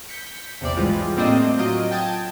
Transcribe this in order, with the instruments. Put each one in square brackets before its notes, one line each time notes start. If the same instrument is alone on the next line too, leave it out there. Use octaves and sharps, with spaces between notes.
[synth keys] G6 B6 C#7
A#1 E2 C3 C5 D5
G#2 E3 G3 G#3 F4
A2 A#3 C4 D4 D#5 D7
F#3 F4 D#5 D7
G5 A5 D#6 G#6